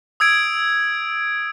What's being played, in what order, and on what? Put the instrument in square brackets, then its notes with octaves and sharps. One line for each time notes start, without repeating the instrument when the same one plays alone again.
[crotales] D#6 E6 G#6 D7